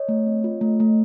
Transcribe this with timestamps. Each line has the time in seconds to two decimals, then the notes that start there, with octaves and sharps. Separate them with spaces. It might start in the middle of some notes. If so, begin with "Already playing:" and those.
Already playing: C#5 D#5
0.08 A3
0.27 C4
0.44 F4
0.61 A3
0.80 A3